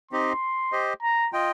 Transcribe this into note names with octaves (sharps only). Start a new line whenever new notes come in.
C4 D#4 G4 D#5 C6
G4 C5 D#5
A#5
F4 D#5 G5